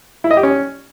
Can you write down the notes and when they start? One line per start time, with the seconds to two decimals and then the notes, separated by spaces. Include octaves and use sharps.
0.24 E4
0.31 D#5
0.37 G4
0.43 C#4